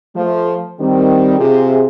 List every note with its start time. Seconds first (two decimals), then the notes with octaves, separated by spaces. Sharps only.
0.16 F3 A3
0.80 D#3 G3 C4
1.39 C3 F4 G#4